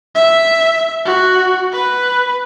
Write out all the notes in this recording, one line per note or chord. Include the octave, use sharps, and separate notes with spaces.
E5
F#4
B4